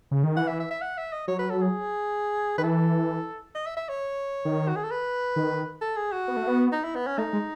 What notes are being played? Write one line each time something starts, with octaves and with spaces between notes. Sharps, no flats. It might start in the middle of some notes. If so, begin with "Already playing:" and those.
C#3
D#3
E3 F#5
E5
E5
E5
F#5
E5
D#5
F#3 C#5
B4
A4
G#4
D#3 B4
E3 A4
D#5
E5
E5
C#5
D#3
F#4
G#4
A4
B4
D#3
A4
G#4
F#4
B3
A3
B3
D#4
E4
B3
C#4
A3 D#4
G#3